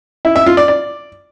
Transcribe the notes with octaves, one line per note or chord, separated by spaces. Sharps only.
E4
E5
F4
D5
D5